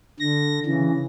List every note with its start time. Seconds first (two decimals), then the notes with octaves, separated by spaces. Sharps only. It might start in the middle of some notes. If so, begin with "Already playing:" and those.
0.20 D3 A#6
0.66 C#3 E3